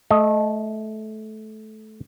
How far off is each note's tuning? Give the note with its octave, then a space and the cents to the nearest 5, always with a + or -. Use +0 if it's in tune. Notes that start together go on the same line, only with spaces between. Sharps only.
A3 -20 D#5 +0